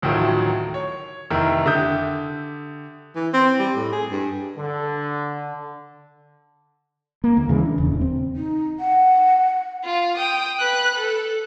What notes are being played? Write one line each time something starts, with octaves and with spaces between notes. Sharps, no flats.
A1 D2 A2 D#3 F3 F#3
C#5
F1 D#3 E4 A#4
D3 G4 E5 D#6 G6
E3
C4
G3
A2
G#4
G2
D3
A#3
D2
C#3 E3 G#3
D4
D#1 E2 C#3
C4
D#4
F#5
F4
G5 D#6
B4 F#6
A4